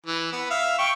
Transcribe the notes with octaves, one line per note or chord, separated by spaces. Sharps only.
E3
B3
E5 F5
G5 C#6